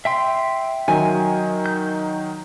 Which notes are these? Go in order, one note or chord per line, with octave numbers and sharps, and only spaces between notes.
E5 G5 C6
D#3 F#3 G#5
G6